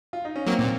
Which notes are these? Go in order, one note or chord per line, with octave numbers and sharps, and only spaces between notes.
F4
D#4
C#4
F#3 A#3 C4
A#2